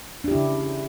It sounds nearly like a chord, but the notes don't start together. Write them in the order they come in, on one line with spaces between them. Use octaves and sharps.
D4 G4 E4 C#3